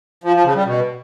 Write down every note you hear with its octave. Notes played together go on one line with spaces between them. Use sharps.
F3
F3
C#3
G3
B2